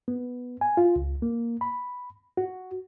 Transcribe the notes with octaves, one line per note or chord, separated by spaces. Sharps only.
B3
G#5
F4
C#2
A#3
B5
F#4